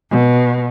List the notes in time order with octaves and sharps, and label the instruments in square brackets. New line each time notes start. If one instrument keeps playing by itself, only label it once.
[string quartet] B2